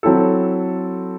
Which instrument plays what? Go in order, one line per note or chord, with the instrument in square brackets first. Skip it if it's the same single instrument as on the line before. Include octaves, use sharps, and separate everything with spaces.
[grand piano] F#3 C4 E4 A4